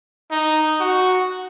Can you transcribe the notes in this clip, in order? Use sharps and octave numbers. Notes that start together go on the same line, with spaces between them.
D#4
F#4